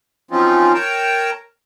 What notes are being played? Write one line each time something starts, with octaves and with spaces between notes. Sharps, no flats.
F3 F#3 C4 C#4 D#4 F4
A#4 C#5 G5 A5 A#5